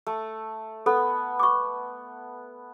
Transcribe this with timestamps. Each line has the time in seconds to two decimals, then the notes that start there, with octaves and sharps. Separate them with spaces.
0.07 A3
0.86 B3 A4
1.40 C#6 D6